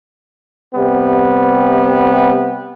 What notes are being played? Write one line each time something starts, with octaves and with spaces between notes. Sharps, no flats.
C3 G3 B3